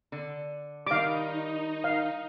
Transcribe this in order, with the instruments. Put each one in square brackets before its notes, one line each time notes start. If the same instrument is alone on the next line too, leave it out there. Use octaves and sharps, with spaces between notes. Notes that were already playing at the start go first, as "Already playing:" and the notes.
[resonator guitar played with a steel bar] D3
[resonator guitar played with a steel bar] D#3 G3 [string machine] D#4 [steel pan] F5 D6
[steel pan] F5